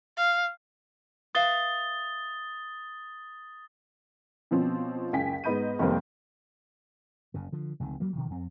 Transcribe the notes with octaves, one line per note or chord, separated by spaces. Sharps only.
F5
B4 E5 F5 D#6 A6 G7
B2 F3 C4 C#4
F#1 C#2 G5 G#5 B6
G#2 B3 D#5 B5 G6 D#7
F1 D#2 G3 A#3 C5
F#1 F#2 C#3
D3 F3
F1 C#2 C3 D#3
D2 F#3 G3 A#3
B2 D#3 F3
F2 C4